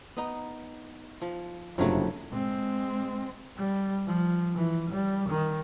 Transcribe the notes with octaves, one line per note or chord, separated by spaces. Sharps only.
B3 D#4
F3
F#1 F2 C3 F3 F#3 A3 D4
G#3 C4
G3
F3
E3
G3
D#3